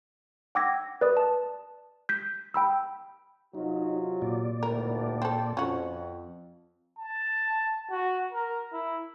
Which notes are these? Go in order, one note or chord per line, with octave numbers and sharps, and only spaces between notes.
F#5 G5 D6 E6 G#6 A#6
B4 D5 D#6
A5
G6 B6
G5 B5 E6
C3 F#3 D#4 F4
A#2 D5
G#1 D2 A2 A#4
C4 A4
F2 C#4 F#4
A5
F#4
A#4
E4